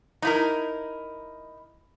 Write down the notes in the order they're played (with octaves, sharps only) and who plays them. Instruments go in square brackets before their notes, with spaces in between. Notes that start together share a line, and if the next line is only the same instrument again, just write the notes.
[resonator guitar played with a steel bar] D#4 E4 A#4